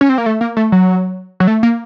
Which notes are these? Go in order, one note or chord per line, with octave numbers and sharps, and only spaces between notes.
C#4
C4
A#3
A3
A#3
A3
F#3
F#3
A3
A#3